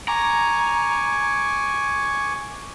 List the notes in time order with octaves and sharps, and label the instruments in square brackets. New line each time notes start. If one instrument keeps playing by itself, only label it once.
[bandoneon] G#5 C#6 D6 [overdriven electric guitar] A#5